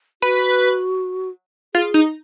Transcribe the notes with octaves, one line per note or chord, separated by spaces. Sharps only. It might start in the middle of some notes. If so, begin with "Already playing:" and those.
F#4 B4
F4 G#4
D#4